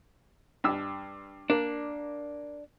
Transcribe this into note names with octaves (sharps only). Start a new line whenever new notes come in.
G2 E6
A#3 D4